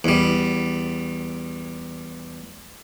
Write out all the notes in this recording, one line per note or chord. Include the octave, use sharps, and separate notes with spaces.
E2 G3